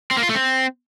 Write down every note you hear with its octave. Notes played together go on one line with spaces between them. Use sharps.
C4
A#3
F4
A3
C4